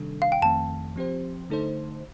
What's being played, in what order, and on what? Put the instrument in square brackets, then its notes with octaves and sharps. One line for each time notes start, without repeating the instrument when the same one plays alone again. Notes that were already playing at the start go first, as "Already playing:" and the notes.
Already playing: [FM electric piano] C3 D#3 G3 D4 A4
[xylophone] F5
G5
[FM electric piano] F2 D#3 A3 C4 [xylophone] A5
[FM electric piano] F3 C4 G4 C5
D3 A3 D#4 A4 C5